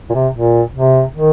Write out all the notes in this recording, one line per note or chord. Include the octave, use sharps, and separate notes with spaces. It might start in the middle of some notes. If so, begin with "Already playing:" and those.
A#2
C3
A#2
C3
D#3